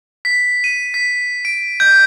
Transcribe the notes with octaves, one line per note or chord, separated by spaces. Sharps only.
B6
D#7
B6
D7
G6